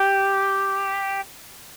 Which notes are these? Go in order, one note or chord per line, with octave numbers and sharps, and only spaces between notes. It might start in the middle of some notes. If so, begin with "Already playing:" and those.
Already playing: G4